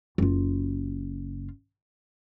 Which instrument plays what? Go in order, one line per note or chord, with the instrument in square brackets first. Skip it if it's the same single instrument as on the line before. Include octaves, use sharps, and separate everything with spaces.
[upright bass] F#1 F4